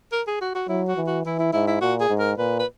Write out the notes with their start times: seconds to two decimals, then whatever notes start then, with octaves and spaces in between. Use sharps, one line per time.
0.12 A#4
0.27 G#4
0.41 F#4
0.55 F#4
0.68 F#3 E4
0.88 F#4
0.97 E3
1.07 F#4
1.25 E3 E4
1.39 E4
1.53 G#2 E4
1.67 E4
1.81 A#2 F#4
2.00 G#4
2.10 G#2
2.19 A#4
2.38 A#2 B4
2.59 B4